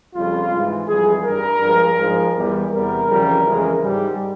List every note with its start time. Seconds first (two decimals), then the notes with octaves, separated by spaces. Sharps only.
0.15 F2 C#3 G3 F4
0.52 G#2 E3 G#3
0.88 F2 E3 G3 G#4
1.24 G2 G3 A#4
1.60 G2 F3 G#3
1.97 G#2 F3 G#3
2.34 E2 E3 G3
2.71 E2 C3 G3 A#4
3.06 F2 C#3 E3 G3
3.44 F2 C#3 E3 G#3
3.80 G#2 G3